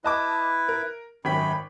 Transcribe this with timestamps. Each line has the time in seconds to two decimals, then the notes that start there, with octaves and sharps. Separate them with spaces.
0.04 E4 B4 D#5 A5 D6
0.69 A#4
1.25 G#1 F#2 G5 B5 B6